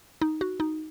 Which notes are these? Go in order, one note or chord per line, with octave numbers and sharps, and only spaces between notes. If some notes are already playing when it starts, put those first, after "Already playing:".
D#4
F#4
D#4